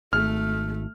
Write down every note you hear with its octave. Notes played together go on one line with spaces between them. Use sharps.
G#1 A3 F6